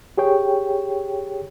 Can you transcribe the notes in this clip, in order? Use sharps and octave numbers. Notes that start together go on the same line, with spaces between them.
G4 G#4 C#5 G5